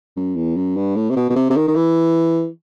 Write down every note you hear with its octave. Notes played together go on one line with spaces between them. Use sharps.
F#2
E2
F#2
G2
A2
C3
B2
B2
C3
C3
D#3
D#3
E3